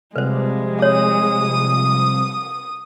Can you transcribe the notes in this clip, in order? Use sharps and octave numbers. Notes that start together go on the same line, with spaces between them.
C3 F3 G3 G#3 B4 C5
C#5 D#6